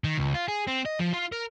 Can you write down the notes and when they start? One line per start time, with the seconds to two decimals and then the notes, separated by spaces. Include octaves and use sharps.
0.04 D#3
0.18 C#2
0.34 F4
0.48 G#4
0.67 C4
0.85 D#5
0.99 F3
1.13 F4
1.32 A#4